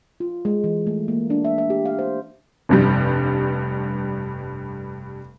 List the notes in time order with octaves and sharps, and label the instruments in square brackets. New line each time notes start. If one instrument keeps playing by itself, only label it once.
[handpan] F4
G#3
E3
A3
A#3
D4
E5
E5
G4
F5
C5
[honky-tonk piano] F1 G2 G3